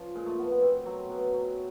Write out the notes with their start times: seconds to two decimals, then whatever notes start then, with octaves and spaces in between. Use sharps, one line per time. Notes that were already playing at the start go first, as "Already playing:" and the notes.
Already playing: F3 C#4
0.15 A#2 G#3
0.26 A3
0.39 F3 B3
0.51 B3
0.62 B2 C4
0.86 F#3
1.09 B2
1.33 F#3